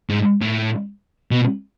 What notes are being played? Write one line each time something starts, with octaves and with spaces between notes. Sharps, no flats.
G#2
A2
B2